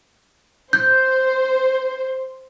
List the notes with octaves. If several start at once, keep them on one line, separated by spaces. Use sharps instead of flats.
C5 G6